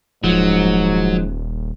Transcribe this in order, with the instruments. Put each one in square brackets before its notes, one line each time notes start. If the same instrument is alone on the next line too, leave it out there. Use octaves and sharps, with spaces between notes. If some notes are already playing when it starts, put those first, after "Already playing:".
[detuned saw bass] D#1 [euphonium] G#2 [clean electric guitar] F3 [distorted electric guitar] F#3